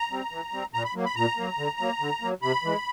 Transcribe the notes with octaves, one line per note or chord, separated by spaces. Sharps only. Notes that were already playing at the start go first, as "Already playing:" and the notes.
Already playing: A#5
G3 C4
E3
G3 C4
A#2 A#5
B5
F#3 A#3
B5
A#2 A#5
F#3 A#3
D3
F#3 A#3
D3
F#3 A#3
C3 B5
E3 G#3